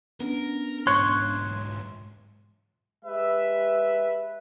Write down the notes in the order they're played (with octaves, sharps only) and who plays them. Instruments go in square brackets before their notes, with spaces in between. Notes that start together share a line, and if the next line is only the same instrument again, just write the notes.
[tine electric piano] B3 C#4 D4 [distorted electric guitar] A#4
[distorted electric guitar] B1 G#2 [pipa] C#5 [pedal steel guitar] C6 F#6
[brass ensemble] G#3 G4 B4 E5